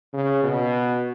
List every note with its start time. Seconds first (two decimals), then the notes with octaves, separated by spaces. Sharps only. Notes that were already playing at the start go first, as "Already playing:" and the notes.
0.13 C#3
0.44 B2